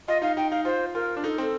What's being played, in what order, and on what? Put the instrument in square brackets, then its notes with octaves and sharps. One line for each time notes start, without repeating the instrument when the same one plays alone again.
[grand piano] F4 [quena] D#5
[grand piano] D#4 [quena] F5
[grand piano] D#4 [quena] G5
[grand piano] D#4 [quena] F5
[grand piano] F4 [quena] C5
[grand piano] F4 [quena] A#4
[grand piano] D4
[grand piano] D#4 [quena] A4
[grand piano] C4 [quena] A4